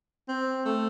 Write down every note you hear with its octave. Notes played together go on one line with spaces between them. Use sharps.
C4
A3